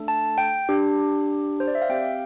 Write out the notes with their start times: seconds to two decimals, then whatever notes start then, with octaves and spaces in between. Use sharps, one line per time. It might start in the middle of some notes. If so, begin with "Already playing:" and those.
Already playing: A3 D4 A4
0.08 A5
0.38 G5
0.69 D4 G4
1.60 C5
1.67 D5
1.75 E5
1.82 F5
1.89 C4 G4 G5
2.05 F5